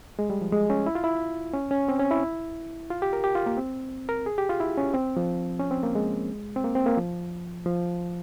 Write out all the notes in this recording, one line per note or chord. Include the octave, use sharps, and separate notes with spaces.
G#3
G3
F3
G#3
C#4
E4
F4
E4
C#4
C#4
C4
C#4
E4
F4
G4
A#4
G4
F4
A#3
C4
A#4
G#4
G4
F4
E4
C#4
C4
F3
C#4
C4
A#3
G#3
C4
A#3
C4
A#3
F3
F3